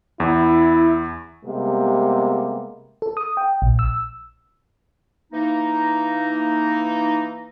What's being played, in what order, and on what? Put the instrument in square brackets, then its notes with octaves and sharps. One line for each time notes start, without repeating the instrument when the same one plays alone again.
[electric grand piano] E2 [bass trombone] E4
[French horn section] C3 G3 G#3 A#3 B3
[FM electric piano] A4
D#6
G5
A#1
E6
[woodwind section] E3 A#3 D#4